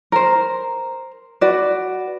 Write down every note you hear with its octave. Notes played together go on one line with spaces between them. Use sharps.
A#4 C5
F#4 B4 D5